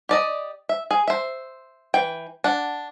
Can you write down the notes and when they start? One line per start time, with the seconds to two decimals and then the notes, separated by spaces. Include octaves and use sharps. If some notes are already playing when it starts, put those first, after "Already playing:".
0.09 G4 D5 D#5
0.69 E5
0.91 G#4
1.07 C5 E5
1.94 E3 G5
2.44 D4 F#5